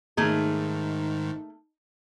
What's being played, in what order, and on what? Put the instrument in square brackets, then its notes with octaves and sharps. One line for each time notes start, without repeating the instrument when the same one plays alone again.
[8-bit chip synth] G#2 D#3 [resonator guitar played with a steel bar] A3 A#3 G#4 [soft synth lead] D#4